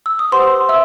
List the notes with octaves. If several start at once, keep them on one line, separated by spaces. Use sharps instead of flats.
E6
D#6
G4 B4 C5 F#5 C6
E5 E6